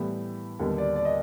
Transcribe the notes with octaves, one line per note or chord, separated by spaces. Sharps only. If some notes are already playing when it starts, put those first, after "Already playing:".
Already playing: A2 E3 G3 B3
D#2 D3 G3 B3
D5
D5
D#5